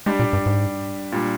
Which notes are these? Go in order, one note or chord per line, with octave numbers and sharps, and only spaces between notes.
G3 G#3 D4 G4
A#2
G2
G#2
A#2 G3 D4